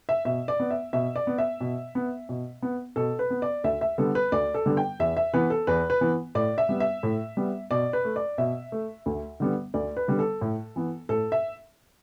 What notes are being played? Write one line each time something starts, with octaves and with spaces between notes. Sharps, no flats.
E5
B2 E5
D5
B3
E5
B2 E5
D5
B3
E5
B2
B3
B2
B3
B2 A4
B4
B3
D5
D2 E5
E5
D3 G3 B3 A4
B4
D2 D5
A4
D3 G3 B3
G5
E2 E5
E5
E3 B3 B4
A4
E2 B4
B4
E3 B3
A2 D5
E5
G3 B3
E5
A2
G3 B3
B2 D5
B4
A3
D5
B2 E5
A3
D2
D3 G3 B3
D2 D5
B4
D3 G3 B3
A4
A2
E3 B3
A2 A4
E5